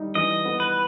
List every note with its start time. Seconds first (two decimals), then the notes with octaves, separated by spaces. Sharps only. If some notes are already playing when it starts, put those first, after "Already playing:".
Already playing: G3 D#4
0.15 E3 D#5
0.45 B3
0.60 B4